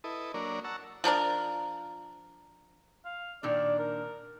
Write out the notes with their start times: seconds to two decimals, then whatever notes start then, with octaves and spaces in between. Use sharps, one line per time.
0.04 E4 A4 B4 D#5
0.34 F#3 A#3 D4 A#4 C#5 D5
0.64 F#5 A5 A#5 C#6 E6
1.04 F3 D4 A#4 D5
3.05 F5
3.43 A#2 D#3 D4 D5
3.79 A#4